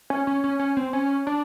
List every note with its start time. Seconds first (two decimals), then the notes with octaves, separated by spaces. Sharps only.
0.10 C#4
0.27 C#4
0.44 C#4
0.59 C#4
0.77 C4
0.93 C#4
1.27 D4